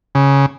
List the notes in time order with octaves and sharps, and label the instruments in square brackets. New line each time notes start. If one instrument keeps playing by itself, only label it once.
[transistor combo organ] C#3